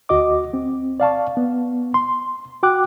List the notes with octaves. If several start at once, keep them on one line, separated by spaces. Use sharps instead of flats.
D2 F#4 D#5 D6
C4
D5 F5 A5 C#6
B3
C6
F#4 G5 D6 F#6